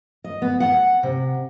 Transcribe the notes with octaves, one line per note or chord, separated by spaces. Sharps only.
D#5
B3
F#5
C3